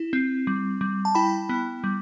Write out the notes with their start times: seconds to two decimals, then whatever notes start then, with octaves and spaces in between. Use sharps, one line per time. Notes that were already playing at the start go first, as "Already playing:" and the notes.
Already playing: E4
0.13 C4
0.47 G3
0.81 G3
1.05 A5
1.15 E4 G5 B5
1.49 B3
1.84 G3